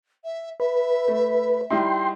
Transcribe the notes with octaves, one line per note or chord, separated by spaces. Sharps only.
E5
B4 E5
A3
G3 D#4 E4 G5 C6